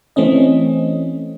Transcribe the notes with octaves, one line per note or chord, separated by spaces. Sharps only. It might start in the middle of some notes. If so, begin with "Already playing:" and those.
E3 A3 C4 C#4 D#5